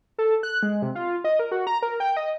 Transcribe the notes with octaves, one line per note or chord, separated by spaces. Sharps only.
A4
F#6
G#3
C3
F4
D#5
A#4
F#4
A#5
A#4
G5
D#5